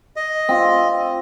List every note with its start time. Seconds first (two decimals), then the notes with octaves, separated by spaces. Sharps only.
0.16 D#5
0.49 C4 F4